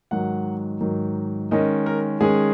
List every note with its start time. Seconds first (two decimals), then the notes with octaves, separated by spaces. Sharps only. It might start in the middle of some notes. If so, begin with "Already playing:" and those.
0.11 G#2 D#3 F#3 F#5
0.81 G#2 D#3 F#3
1.51 D#3 G#3 C#4 D#5
1.86 A#4
2.21 D#3 G#3 C#4 G#4